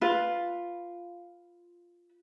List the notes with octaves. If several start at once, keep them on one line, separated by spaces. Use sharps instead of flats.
F4 B4